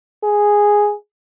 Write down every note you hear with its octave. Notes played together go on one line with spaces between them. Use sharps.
G#4